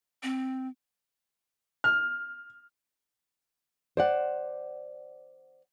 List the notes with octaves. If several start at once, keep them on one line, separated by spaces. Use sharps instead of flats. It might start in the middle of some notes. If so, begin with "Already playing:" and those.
C4
F6
C5 D5 F#5